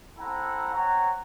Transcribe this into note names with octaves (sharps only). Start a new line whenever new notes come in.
C4 E4 A4 F#5 A#5
C4 C#5 F#5 A#5